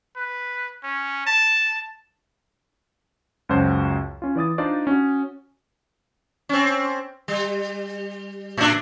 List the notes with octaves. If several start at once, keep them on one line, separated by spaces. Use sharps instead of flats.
B4
C#4
A5
C#2 F#2 F#4 C5 C#5 A5
C#4 F4
E3 D5 D#6 A6
D4 D#4 F4 C5 D5
C#4 F#4
C4 C#4
G3
A2 D4